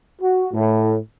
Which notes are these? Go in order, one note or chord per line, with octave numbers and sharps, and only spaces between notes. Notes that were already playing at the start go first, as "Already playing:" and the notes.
F#4
A2